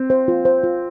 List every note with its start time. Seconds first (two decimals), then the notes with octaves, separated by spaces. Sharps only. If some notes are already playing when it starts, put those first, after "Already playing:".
Already playing: C4
0.10 C5
0.28 F4
0.45 C5
0.63 F4